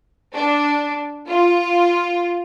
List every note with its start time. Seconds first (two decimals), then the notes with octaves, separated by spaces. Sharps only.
0.33 D4
1.28 F4